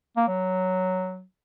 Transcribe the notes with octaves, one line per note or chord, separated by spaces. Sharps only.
A#3
F#3